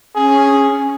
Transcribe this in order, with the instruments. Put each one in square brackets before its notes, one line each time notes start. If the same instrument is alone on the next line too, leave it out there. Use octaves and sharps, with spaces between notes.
[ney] C#4 [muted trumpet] G#4